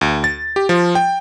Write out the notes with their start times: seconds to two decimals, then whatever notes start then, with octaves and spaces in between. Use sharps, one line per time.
0.01 D2
0.24 A6
0.56 G4
0.69 F3
0.95 G5